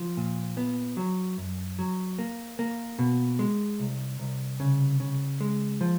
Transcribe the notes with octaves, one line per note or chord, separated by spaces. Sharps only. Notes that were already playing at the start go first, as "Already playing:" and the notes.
Already playing: F3
A#2
B3
F#3
F#2
F#3
A#3
A#3
B2
G#3
C2
C2
C#3
C#3
G#3
F3